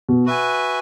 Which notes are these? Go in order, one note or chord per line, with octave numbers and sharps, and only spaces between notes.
B2
F#4 B4 E5 G#5